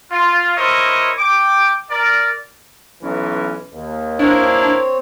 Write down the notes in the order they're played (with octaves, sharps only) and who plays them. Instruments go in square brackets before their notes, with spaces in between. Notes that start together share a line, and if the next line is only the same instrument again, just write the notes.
[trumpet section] F4
E4 A#4 C5 C#5 D#5
G5 D6
A#4 D5
[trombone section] B1 E3 C#4
D#2
[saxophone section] A#3 E4 [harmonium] C4 C#5 [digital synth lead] D4